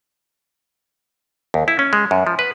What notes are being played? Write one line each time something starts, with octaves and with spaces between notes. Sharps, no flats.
D#2
E4
C#4
G#3
F#2
F3
B4